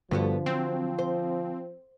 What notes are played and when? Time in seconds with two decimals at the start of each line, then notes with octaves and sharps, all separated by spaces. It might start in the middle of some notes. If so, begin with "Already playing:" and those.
0.11 G2 D3 F3 B3 F#4 A4
0.46 F#3 C4
0.99 C5